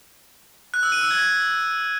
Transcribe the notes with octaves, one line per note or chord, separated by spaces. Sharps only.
F#6
E6
D#7
E6
G#6